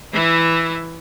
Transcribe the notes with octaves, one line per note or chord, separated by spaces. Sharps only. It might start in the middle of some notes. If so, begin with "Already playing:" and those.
E3 E4